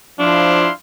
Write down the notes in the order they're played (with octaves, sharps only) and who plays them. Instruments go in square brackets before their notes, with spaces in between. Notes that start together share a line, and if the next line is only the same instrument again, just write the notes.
[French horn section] F3 [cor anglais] D4 [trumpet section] E4 F5 C6